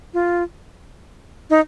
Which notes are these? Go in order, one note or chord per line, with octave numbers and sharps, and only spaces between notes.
F4
D#4